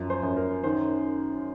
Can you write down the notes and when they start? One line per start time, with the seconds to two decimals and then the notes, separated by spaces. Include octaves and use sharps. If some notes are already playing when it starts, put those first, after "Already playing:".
Already playing: F#2 F3
0.10 C5
0.23 F#2
0.37 A#4
0.64 D#3 C5